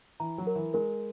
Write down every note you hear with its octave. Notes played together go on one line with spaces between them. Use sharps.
E3 A#5
F#3
A#4
E3
G#3 A#4